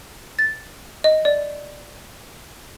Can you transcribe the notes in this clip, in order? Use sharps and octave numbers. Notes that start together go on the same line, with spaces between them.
A6
D#5
D5